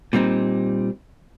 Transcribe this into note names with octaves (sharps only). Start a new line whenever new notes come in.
A#2 G3 C4 D#4